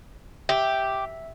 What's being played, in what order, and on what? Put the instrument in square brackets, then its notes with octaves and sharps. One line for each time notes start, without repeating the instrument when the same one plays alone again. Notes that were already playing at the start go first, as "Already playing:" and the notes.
[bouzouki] G4 [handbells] E5